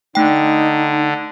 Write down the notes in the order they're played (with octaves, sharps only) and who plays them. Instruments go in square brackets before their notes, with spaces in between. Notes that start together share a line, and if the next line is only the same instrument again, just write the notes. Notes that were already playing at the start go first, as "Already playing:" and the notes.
[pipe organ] D3 [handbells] A3 G5 [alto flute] D#4